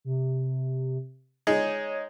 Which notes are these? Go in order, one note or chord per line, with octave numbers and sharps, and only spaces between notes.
C3
G#3 D#4 G#4 C#5